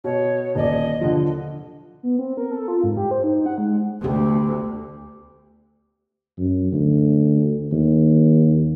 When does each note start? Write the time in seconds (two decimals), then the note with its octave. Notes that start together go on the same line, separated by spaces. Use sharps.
0.04 B2 C#5
0.55 D#1 D5 D#5
1.01 D3 F3
2.03 B3
2.19 C4
2.37 A#4
2.51 A4
2.68 F4
2.84 G#2
2.97 G4
3.11 C5
3.24 D#4
3.46 F#5
3.58 G#3
4.02 D2 B3 G4
6.38 F#2
6.72 D2
7.72 D#2